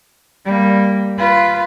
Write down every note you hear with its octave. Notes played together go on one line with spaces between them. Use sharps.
G3 A#3
F4 B4